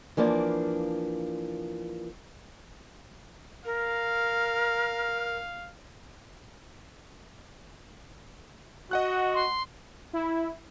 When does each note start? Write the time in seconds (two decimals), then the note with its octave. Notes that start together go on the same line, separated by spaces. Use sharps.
0.17 E3 F3 A#3 D4
3.65 A#4 F5
8.91 F#4 D#5 F#5 F#6
9.34 C6
10.13 E4